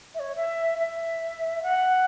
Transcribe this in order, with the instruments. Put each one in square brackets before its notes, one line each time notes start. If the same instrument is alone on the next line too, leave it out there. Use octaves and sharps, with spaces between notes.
[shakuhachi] E5
C#5
E5
E5
F#5